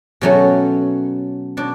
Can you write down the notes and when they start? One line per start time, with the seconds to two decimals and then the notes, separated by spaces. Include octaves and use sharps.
0.21 B2 F#3 A3 C#4
1.57 B2 D4